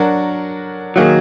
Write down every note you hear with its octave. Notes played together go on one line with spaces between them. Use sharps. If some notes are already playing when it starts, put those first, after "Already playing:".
Already playing: F#3 D4 F#4 A#4
D#3 F#3 A#3 D#4 G#4